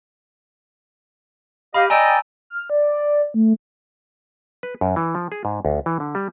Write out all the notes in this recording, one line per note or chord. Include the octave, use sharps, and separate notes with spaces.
G4 D#5 F5 B5
D5 D#5 G5 G#5 A#5 E6
F6
D5
A3
B4
F#2
E3
F3
G#4
G#2
D2
E3
D3
G3